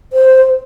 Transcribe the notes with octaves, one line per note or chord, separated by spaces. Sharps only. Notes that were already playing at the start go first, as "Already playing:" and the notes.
C5